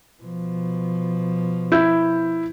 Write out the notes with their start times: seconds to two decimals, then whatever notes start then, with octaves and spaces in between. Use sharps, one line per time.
0.22 B2 F3
1.72 E4 G6